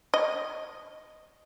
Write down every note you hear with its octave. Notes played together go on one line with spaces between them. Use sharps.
D#5